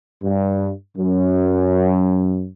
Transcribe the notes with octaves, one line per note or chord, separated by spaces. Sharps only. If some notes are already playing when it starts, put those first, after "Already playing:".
G2
F#2